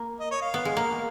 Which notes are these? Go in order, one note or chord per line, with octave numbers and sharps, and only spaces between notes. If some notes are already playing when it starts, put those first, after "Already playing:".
Already playing: A#3
D#5
C#5
F5
B3
G#3
A#3